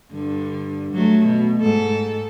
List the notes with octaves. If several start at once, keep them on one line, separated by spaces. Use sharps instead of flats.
G2 D3
F#3 A3
B2
G#2 A4